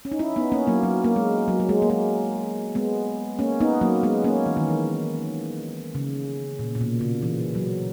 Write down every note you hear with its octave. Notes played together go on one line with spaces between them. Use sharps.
C#4
D#4
C#4 E4
B3 D#4
A#3 C#4
F#3 A#3
F#3
A#3
G#3
F#3
F#3
G#3
A#3
G#3
G#3 B3
A#3 C#4
B3 D#4
F#3 A#3
G#3 B3
A#3 C#4
E3
D#3
E3
C#3
A#2
A#2
B2
C#3
E3
F#3